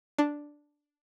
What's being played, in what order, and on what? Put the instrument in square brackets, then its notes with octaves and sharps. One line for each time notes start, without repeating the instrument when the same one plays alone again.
[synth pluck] D4